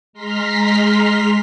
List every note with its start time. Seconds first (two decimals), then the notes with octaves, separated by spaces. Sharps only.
0.13 G#3 A#5 C6 F6 B6